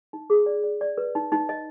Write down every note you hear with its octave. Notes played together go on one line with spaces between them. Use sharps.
D#4
G#4
D5
D5
D5
B4
D#4
D#4
D#5